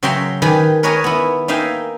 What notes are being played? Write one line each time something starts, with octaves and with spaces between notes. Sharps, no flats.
C#3 F#3 E5 G5 A#5 C6
D#3 G4 G#4 B4
A#4 B4 C#5 D#5 G#5 A#5
B3 E4
A#3 D#4 E5 F5 G5 G#5